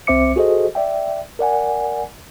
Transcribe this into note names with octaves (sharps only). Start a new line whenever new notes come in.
C2 C4 C5 E5 D6 C#7
F#4 G#4 A4 C5 D#5
D5 E5 G5
A#4 D5 F#5 G#5